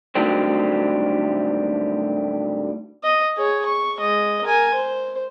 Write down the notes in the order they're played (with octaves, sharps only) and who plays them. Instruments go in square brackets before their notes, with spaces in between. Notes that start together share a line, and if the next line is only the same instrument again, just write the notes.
[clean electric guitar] A2 D3 D#3 F#3 G3 C4
[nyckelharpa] D#5
G#4 C#5
C#6
G#3 D#5
A#4 G#5
C5